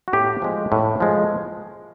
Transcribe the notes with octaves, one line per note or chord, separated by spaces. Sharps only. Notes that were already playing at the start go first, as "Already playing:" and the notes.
F#4
A2 G4
F3 G#3
A2
F3 G#3